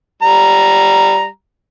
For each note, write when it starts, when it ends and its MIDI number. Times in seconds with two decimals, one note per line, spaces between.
0.22 1.27 55
0.22 1.27 82